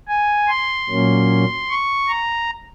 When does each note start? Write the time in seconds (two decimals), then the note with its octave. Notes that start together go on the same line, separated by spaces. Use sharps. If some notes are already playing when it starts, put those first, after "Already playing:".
0.08 G#5
0.48 C6
0.89 A#2 F#3 A#3 C#4
1.69 C#6
2.09 A#5